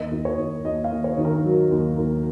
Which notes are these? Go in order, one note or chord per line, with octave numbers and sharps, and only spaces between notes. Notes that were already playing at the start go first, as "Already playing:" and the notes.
Already playing: D#2 D#5
D#2
C#5
D#2
D#2 D#5
F5
D#2
C#5
D#3
A#4
F#3
D#2
D#2